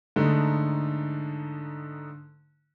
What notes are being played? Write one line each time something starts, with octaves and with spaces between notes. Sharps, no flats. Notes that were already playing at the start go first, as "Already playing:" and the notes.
G#2 D3 A3 D#4